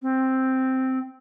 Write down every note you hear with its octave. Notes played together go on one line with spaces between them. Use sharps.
C4